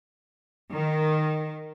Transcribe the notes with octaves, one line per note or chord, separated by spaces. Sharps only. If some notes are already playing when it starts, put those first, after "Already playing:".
D#3